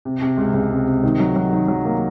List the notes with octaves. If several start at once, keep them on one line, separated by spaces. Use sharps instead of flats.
C3
C3
C#2
C#2
C3
C3
D#3
F#3
F#3
D#3
F#3
A#3